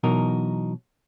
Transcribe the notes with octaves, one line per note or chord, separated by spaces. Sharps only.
B2 E3 F#3 D#4 A#4